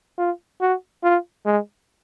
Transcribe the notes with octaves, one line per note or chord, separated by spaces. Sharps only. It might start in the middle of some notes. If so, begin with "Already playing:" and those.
F4
F#4
F4
G#3